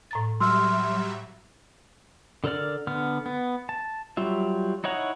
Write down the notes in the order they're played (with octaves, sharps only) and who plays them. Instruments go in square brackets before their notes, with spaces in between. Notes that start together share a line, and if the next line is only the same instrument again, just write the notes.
[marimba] A2 A#5 A6
[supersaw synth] F#3 G3 E5 [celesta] C6 E6 F6
[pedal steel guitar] D3 A4 A#4 D5 F6
D3 B3 F6
B3
A5
F#3 G3 F4 E5
D#4 E4 C#5 F#5 A#5